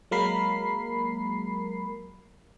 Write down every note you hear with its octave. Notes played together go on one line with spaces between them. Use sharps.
F#3 G#3 A#3 A#4 B5 C7